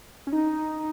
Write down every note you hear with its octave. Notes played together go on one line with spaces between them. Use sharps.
C#4
D#4